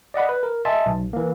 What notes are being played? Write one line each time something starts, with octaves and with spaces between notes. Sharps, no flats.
D5 D#5 F#5 B5
B4
A#4
D#5 E5 G#5 A5 C6
B1
E3 A#3